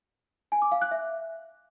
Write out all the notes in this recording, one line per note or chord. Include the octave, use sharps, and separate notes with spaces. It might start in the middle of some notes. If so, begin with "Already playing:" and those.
G#5
D6
F5
F#6
E5